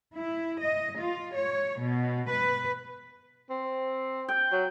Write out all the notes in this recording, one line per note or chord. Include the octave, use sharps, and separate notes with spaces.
E4
D#5
F4
C#5
B2
B4
C4
G5
F#3